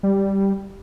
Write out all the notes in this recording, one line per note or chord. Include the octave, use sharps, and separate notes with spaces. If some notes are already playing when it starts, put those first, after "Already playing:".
G3